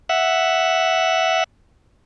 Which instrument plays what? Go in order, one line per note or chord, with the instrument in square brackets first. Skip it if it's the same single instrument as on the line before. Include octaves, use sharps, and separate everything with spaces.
[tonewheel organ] E5 F#5